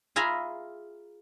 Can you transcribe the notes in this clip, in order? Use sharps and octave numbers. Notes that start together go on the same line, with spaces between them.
F4 G#4 E5 G#5 A#5 B5